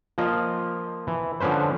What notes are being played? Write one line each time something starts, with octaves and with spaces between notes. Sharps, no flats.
F3 A#3 F4 D#5
E3
D3 F3 C#4 B4 C5